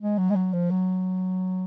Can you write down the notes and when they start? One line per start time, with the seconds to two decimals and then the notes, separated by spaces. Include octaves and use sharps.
0.01 G#3
0.18 F#3
0.30 G#3
0.35 F#3
0.53 F3
0.70 F#3